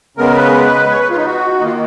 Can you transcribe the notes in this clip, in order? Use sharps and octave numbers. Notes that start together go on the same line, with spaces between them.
C#3 G#3 B3 A#4
B4
C#5
B4
F4
D#4
F#4
D#4
D#3 A#3 F4